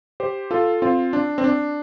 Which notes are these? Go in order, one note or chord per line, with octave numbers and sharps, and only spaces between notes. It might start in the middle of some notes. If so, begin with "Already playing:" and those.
G4 C5
F4 A4
C4 F4
D4
C4
D4